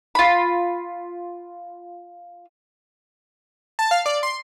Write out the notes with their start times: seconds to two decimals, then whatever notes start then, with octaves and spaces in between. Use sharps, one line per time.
0.15 F4 B5
3.79 A5
3.91 F5
4.06 D5
4.23 C6